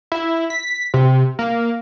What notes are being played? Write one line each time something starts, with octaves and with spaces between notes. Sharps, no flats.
E4
B6
C3
A#3